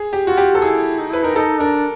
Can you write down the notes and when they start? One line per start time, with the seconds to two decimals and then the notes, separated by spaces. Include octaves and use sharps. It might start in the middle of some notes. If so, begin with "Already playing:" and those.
Already playing: G#4
0.13 G4
0.24 F4 F#4
0.37 G4
0.55 A4
0.61 E4 G#4
0.99 D#4
1.11 E4 B4
1.23 D#4 A#4
1.36 D#4 A4
1.60 D4 A#4